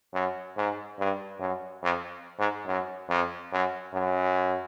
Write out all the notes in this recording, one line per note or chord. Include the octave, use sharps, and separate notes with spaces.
F#2
G#2
G2
F#2
F2
G#2
F#2
F2
F#2
F#2